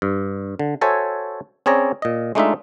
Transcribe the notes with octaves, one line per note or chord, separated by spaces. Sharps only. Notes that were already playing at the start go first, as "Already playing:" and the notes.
G2
D3
F#4 A4 C5 C#5 E5 G#5
C4 C#4 G#4 C#5 D5 A#5
A#2 D#5
G#3 A3 D4 D#4 F4 E5